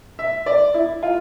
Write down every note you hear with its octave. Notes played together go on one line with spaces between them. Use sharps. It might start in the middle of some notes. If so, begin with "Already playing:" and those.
E5
D5
E4
F4